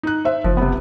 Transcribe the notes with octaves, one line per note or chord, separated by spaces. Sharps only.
D#4 F#6
C5 E5
F#1 F3
C3 B3